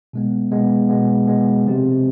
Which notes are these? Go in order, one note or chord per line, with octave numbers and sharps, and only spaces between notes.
B2 G#3 B3
B2 G#3 B3
B2 G#3 B3
B2 G#3 B3
C3 F3 C4 G4